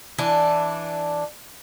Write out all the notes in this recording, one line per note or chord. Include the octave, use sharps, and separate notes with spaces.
E3 D4